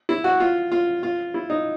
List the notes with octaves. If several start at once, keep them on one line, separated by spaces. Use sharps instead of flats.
E4
F#4
F4
F4
F4
E4
D#4